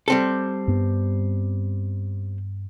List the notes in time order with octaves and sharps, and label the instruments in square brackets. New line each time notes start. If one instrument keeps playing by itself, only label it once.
[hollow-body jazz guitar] G3 C4 A4
[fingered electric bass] G2 B3